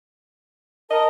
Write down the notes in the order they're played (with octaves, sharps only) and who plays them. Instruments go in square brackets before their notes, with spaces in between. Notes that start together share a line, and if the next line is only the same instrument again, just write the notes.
[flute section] A#4 A5 D#6 [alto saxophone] D#5